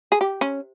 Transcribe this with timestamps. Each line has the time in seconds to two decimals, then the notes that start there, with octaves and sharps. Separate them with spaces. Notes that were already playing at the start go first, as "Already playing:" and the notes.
0.12 G#4
0.21 G4
0.41 C#4